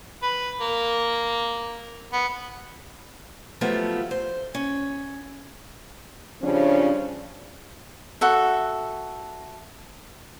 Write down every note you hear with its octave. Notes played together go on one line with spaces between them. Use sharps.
B4
A#3
B3
F3 F#3 A3 B3 F4 G4
C5
C#4
C#3 F3 G3 C#4 D4
F#4 A4 E5